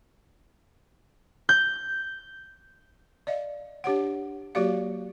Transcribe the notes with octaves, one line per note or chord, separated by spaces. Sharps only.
G6
D5 D#5 F5
D4 G4 C#5 F#5
F#3 A#3 F#4 G4 D5 F5